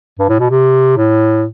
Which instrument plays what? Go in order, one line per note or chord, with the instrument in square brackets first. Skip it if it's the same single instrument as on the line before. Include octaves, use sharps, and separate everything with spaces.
[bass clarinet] G2
A2
B2
C3
A2